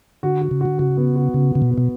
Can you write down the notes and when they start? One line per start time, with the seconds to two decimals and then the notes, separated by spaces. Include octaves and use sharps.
0.23 D3 F#4
0.41 F#4
0.51 C#3
0.61 D3 F#4
0.79 C#3 F#4
0.97 B3
1.16 F#4
1.34 C#3 F#4
1.52 C#3 F#4
1.62 B2
1.71 B3
1.78 B2